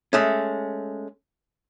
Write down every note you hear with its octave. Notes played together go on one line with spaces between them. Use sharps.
G#3 A3 C#4